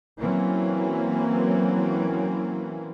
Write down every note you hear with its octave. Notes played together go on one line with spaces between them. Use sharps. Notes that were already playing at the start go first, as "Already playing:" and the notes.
E3 F#3 A#3 C4 C#4